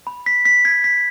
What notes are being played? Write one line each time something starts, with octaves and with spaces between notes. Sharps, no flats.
B5
B6
B6
G#6
B6